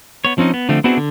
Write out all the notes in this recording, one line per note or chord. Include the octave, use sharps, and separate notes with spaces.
B3 C#5
F3 C4 C#4 D#4
B3
D3 F3 A3 C4
B3 C4 D4 E4 F#4 G#4
D3